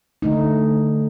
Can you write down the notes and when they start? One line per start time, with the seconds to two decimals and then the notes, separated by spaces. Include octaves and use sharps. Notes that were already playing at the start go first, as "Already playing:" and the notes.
0.22 D3 A3 D#4